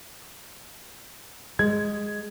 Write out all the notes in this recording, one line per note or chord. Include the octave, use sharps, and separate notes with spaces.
G#3 G#6